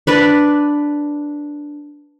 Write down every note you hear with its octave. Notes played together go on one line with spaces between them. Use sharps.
D4 B4 D5